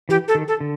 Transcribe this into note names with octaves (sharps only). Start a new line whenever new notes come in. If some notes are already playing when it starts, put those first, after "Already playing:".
E3 G4
A4
D#3
A4
D3